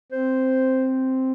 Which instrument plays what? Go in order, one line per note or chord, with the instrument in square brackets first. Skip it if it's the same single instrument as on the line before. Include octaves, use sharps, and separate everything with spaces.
[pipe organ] C4 [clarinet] C5